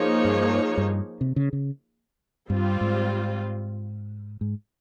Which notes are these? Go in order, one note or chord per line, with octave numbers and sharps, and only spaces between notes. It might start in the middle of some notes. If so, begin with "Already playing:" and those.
Already playing: F3 A#3 D#4 G#4 C#5
G2
G2
C3
C#3
C#3
G2 G3 C4 F4
G#2
G#2